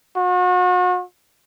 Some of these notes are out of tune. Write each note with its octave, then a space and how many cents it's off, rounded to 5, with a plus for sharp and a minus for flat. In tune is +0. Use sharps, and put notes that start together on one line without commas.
F#4 -40